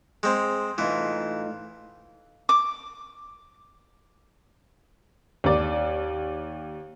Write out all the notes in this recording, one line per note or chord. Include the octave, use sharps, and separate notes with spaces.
G#3 C4
A2 E3 D#4 F4
D6
D#2 D5